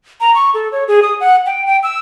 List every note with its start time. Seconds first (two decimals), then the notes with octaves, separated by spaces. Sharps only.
0.21 A#5
0.35 C#6
0.54 A4
0.72 C#5
0.88 G#4
1.02 D#6
1.20 F#5
1.46 G5
1.66 G5
1.83 E6